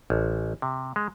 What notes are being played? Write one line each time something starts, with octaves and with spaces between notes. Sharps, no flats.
A1
C3
G#3